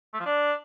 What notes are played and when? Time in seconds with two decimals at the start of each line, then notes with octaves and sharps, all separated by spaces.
0.14 A3
0.20 F3
0.26 D4